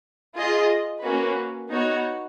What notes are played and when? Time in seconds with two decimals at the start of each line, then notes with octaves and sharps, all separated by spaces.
0.35 F4 G#4 D#5
1.02 A#3 C#4 F#4 B4
1.70 B3 D#4 F#4 C#5 F#5